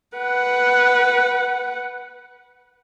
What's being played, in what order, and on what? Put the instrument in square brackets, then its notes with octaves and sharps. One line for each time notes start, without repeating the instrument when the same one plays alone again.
[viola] B4 F#5